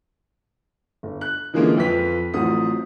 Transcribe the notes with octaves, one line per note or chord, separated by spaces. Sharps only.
G1
F#6
D3 E3 F3 G#3 A#3 C#4
F2 F4 B4 B6
A1 F3 F#3 C4 F#5 D#6